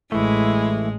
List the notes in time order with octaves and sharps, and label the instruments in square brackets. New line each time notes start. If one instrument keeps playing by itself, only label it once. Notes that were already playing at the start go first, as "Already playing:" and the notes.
[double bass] A1 [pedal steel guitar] E3 A3 [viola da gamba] G#3 [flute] E4